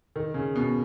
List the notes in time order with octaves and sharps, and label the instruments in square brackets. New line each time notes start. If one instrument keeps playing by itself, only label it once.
[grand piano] D#3
C#3
B2